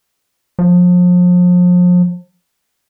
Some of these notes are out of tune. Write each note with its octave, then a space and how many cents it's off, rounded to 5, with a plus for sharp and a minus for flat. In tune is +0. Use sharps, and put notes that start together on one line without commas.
F3 +35